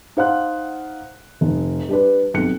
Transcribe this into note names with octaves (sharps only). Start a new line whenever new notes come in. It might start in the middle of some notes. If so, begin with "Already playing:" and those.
D#4 C5 F5 F#5 F#6
F1
G3 D4 B4
B1 C3 F#6 C#7